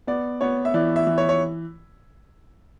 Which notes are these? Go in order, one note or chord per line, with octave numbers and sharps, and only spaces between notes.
B3 D5
B3 C#5
E5
E3 D5
E5
E3
C#5
C#5